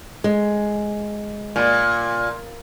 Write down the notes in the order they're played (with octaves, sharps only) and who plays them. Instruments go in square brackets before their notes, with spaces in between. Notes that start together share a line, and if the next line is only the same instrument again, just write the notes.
[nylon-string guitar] G#3
[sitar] A#2